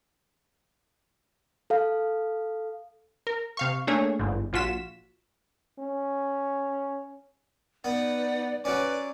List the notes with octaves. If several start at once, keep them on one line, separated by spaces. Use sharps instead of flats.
A4 F5
A#4
C3 F5 C#6
A3 A#3 D4 G#4 C#5
G1 G#2
A#1 F4 F#4 B6 E7
C#4
B3 D#4 B4 D5 F#5
F#3 C#4 B4 D5